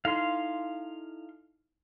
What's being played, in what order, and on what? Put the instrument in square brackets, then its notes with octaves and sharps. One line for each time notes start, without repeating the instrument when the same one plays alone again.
[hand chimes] D#4 E4 A4 [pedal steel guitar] F5 C6